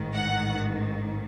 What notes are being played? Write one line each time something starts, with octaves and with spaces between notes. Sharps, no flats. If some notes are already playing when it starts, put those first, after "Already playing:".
Already playing: A1 G#2 D#3
F#5